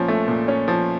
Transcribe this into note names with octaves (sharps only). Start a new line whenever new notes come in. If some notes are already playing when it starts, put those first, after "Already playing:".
Already playing: A#2 F3 C#4
A3
A#2
C#4
F3